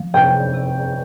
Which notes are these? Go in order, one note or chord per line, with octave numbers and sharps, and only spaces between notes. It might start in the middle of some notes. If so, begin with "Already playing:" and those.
Already playing: F3
C3 G5
C3